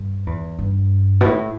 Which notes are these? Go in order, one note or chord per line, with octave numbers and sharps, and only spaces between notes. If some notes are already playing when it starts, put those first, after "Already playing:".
Already playing: G2
E2
G2
B2
A2